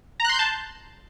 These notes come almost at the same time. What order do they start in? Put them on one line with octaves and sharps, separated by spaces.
A#5 F#6 C6 G6 A5